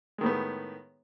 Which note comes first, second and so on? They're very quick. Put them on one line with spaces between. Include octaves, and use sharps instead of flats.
G#3 D#3 A2 B3